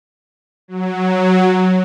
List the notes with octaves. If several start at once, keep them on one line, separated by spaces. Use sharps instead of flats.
F#3